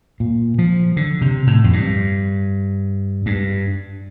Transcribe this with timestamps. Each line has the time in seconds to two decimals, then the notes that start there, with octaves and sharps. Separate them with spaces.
0.20 A#2
0.59 F3
0.97 D3
1.21 C3
1.47 A2
1.64 F2
1.73 G2
3.26 G2